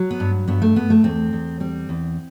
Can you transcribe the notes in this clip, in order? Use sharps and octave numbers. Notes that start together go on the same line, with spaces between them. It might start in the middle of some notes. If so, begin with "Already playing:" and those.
Already playing: F#3
B3
G2
G2 B3
A3
G2 B3
A3
E2 C4
E2
G3 C4
E2